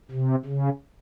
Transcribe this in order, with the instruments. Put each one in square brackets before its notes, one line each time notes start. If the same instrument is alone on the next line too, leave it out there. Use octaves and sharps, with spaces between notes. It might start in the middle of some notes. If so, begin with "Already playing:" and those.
[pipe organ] C3
C#3